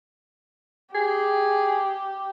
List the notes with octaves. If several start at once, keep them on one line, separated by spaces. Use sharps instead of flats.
G4 G#4